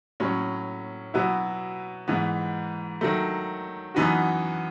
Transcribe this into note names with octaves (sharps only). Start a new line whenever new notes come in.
A2 F#3 C#4
B2 F#3 B3 E4
G#2 E3 B3
D#3 F#3 A3
F#2 E3 B3 D#4 F#4